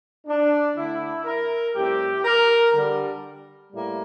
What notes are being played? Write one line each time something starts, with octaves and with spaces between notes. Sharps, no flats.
D4
D3 A3 D4 E4
A#4
A2 G3 C4 G4
A#4
D3 G3 D4
A2 G3 A#3